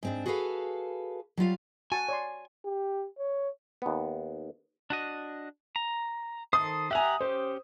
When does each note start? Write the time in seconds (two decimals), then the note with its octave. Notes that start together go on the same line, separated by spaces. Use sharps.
0.03 G#2 C4 D4
0.26 F#4 G#4 A4 B4 F5
1.37 F#3 G3 F4 F5
1.92 F#4 G#5 A5 C#6
2.09 C#5 D5 C6
2.65 G4
3.18 C#5
3.82 D#2 B3
4.90 D4 F#4 D#5
5.76 A#5
6.53 D#3 A4 C5 D#6
6.91 G4 E5 F#5 G#5 A#5
7.21 C#4 G4 C5